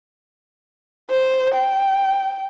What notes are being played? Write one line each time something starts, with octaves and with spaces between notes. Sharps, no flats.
C5
G5